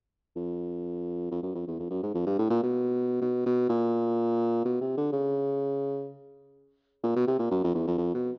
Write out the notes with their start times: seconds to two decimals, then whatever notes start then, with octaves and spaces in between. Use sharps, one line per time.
0.36 F2
1.31 F2
1.43 F#2
1.55 F2
1.67 E2
1.79 F2
1.90 F#2
2.03 G#2
2.14 F2
2.26 G2
2.39 A2
2.50 A#2
2.63 B2
3.22 B2
3.46 B2
3.69 A#2
4.65 B2
4.81 C3
4.97 D3
5.13 C#3
7.04 A#2
7.16 B2
7.27 C3
7.39 A#2
7.51 F#2
7.64 F2
7.75 E2
7.87 F2
7.98 F2
8.14 B2